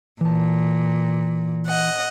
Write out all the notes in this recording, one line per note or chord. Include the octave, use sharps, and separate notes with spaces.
A#2 E3 A5
D#5 F#5